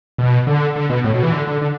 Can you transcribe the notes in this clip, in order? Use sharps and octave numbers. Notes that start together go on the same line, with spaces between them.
B2
D3
D3
B2
A2
B2
E3
D3
D3
D3